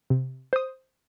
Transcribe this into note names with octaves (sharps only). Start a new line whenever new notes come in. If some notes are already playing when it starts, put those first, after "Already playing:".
C3
C5 D#6